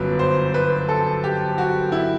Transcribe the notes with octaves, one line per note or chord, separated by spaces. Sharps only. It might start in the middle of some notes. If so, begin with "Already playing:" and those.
Already playing: G1 F#2 F#3 B3 B4
C5
B4
A4
G4
F#4
E4